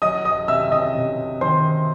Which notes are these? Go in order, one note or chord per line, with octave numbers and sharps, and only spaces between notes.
F#3 D#5 D#6
D#5 D#6
C3 E5 E6
D#5 D#6
C3
D#3 C5 C6